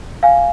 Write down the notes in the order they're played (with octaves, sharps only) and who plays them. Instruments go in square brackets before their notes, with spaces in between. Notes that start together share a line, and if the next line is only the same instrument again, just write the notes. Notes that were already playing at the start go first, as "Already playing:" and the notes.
[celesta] F5 G#5